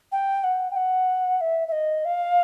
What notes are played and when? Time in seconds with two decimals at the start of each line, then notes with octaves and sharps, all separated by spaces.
0.12 G5
0.44 F#5
0.71 G5
0.76 F#5
1.41 E5
1.68 E5
1.72 D#5
2.05 F5